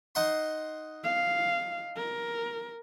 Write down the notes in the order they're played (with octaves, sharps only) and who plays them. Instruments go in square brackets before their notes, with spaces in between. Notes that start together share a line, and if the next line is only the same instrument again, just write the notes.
[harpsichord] D#4 F#5 C6
[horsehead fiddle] F5
A#4